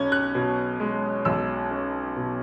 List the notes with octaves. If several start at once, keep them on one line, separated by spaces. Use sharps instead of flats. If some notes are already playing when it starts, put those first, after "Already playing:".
Already playing: B1 C#4 G#6
F#6
B2
G#3
B1 E6
C#4
B2